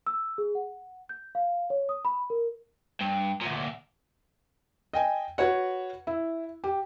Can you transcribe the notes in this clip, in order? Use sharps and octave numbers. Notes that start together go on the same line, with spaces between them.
E6
G#4
F#5
G6
F5
C#5
D#6
B5
A#4
G2
D2 A#2
D#5 G5 G#5
F#4 B4 C#5 F#5
E4
G4